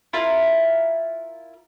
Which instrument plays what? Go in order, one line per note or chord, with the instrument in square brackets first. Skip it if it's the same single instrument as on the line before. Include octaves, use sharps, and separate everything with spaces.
[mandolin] E4 F4 A#4